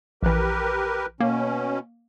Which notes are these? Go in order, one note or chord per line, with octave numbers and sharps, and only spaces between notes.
A#1 E3 G4 A#4 B4
B2 A#3 C#4